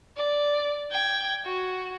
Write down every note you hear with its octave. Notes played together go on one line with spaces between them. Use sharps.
D5
G5 G#6
F#4